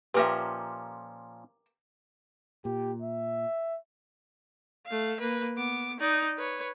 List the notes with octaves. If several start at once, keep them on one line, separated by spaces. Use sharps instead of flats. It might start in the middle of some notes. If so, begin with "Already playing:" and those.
A#2 F3 C#4 G4 A#4 B4 E5
A#2 G4
E5
A3 F5
A#3 B4
B3 D6
D#4 D5
B4 C#5